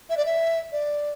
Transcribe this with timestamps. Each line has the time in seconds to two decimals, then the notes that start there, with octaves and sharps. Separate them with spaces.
0.10 E5
0.17 D5
0.26 E5
0.72 D5